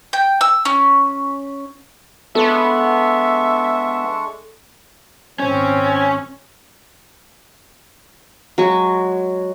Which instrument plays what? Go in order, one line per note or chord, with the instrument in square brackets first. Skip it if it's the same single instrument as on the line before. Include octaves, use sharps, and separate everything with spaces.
[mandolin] G5
E6
C#4
[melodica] G#3 D4 C#6 [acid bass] B3 [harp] A4 [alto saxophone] E5
[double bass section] G#1 A#2 [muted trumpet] C4 [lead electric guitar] C#4
[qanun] F#3 G#3 F#4 C#6